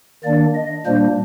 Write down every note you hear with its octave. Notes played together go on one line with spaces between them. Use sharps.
D#3 A#3 D4 D5
D#5
A#2 G3 A#3 D4 C5